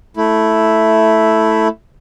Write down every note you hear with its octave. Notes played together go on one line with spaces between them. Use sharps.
A3 E4